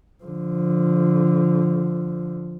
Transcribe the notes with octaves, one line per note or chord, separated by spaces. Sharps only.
D3 F3